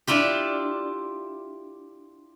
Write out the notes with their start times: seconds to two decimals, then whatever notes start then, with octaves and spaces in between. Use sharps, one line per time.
0.07 D4 E4 F4 G4